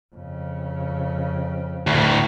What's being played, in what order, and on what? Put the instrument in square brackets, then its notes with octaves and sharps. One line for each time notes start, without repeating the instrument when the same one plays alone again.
[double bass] F2 C#3
[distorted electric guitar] D2 A2